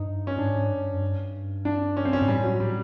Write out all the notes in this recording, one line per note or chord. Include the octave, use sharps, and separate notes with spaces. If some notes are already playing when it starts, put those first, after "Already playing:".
Already playing: G2 D#4
C#4
G#2 D4
G2
F#2
G2
D4
C#4
C4
C#4
G#2
A2 G3
F#3
G3